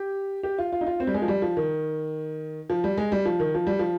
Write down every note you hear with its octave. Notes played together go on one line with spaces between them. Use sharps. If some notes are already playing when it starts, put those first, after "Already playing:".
Already playing: G4
G4
F4
F4
D#4
F4
C4
G3
G#3
F3
G3
F3
D#3
F3
G3
G#3
G3
F3
D#3
F3
G3
F3